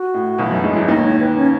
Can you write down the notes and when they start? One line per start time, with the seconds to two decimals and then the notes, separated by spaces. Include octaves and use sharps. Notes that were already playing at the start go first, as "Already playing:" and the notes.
Already playing: F#4
0.14 A2
0.38 B1 B2
0.45 E3
0.51 F#2 F#3
0.63 G#2 G#3
0.75 E2 E3
0.88 D#2 D#3 D#5
1.04 C#5
1.20 B4
1.36 C#4